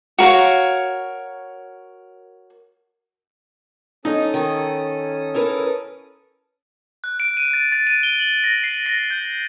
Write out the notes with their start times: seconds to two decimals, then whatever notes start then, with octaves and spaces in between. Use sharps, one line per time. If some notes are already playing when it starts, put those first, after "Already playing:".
0.19 F#4 A#4 C#5 F5
4.05 C#4 D#4 A4 D#6
4.34 D#3
5.34 E4 A#4 B4
7.04 F#6
7.20 D7
7.37 D#7
7.53 A6
7.72 A6
7.87 D#7
8.03 G7
8.20 F#7
8.44 A#6
8.64 C7
8.86 A#6
9.11 G6